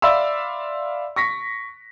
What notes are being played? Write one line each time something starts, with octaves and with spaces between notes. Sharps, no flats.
D5 E5 F5 B5 C6 E6
C#6 A#6 B6